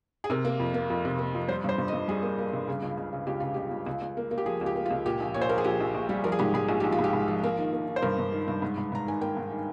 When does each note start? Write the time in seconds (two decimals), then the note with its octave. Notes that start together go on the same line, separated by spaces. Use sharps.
0.24 G#4
0.30 C3 A#4
0.45 A#3
0.60 F2
0.74 A#3
0.90 F2
1.05 C3
1.19 A#3
1.35 F2
1.48 G3 C5
1.64 G2 C5
1.78 G2
1.88 D#5
1.93 G2
2.08 G3 G#4
2.23 A#3
2.38 A#3
2.53 G2
2.68 C#3
2.83 C#2
2.97 C#2
3.13 C#3
3.27 C#2 G4
3.40 C#3 F4
3.54 C#2 G4
3.71 C#2
3.86 C#2
4.02 C#2
4.17 A#3
4.31 A#3
4.38 G4
4.46 F3 G#4
4.61 C#2 G4
4.76 A#3
4.86 F4
4.91 C#2
5.06 A#2 G4
5.20 A#1
5.34 A#2 C#5
5.42 C5
5.49 A#1 A#4
5.58 G#4
5.64 A#1 G4
5.80 A#1
5.94 A#1
6.09 G3
6.24 F3 A#4
6.32 G#4
6.39 G#2 G4
6.54 G#2 G#4
6.69 A#1 G#4
6.80 A#1 G4
6.92 F4
6.99 G#2
7.04 G4
7.13 G#2
7.28 F3
7.43 A#3
7.58 D#3
7.73 A#3
7.88 D#3
7.96 C5
8.02 G2 A#4
8.18 G2
8.32 D#3
8.48 G2
8.62 G#2
8.78 G#2
8.92 G#2 A#5
9.06 D#3 G#5
9.21 A#3 G5
9.37 G#2
9.51 D#3